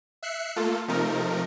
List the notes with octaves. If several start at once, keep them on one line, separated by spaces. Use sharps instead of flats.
E5 F#6 C7 C#7
A3 A#3 F4 A4
C3 F3 A3 D#4 A#4